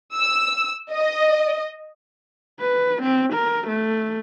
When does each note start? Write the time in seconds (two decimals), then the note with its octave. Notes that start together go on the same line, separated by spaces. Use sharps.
0.16 E6
0.92 D#5
2.60 B4
3.02 C4
3.34 A#4
3.68 A3